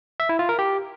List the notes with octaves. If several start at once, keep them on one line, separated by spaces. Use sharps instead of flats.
E5
E4
F4
A#4
G4